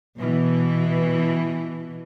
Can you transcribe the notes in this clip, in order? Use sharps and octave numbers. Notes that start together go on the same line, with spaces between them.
B2 E3